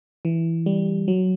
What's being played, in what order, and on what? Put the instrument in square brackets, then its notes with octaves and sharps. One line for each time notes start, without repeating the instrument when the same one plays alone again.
[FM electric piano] E3
G3
F#3